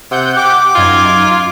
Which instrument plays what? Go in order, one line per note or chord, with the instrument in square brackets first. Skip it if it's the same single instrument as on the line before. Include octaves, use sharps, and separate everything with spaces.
[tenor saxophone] C3 [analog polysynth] F#5 G6
[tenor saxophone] G4 [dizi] D6
[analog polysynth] F#2 D#4 G#6 [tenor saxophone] F4